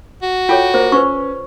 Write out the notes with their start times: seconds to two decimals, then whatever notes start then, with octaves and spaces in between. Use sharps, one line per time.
0.22 F#4
0.49 F4 A4 C#5 G5
0.74 A#3 C5
0.92 C#4 B4 C5 C#6